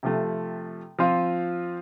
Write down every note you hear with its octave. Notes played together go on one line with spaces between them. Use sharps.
C3 F3 A3
F3 C4 F4